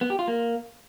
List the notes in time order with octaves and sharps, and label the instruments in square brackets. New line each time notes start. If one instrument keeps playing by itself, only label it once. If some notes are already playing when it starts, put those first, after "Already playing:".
[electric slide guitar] B3
G4
F4
A#3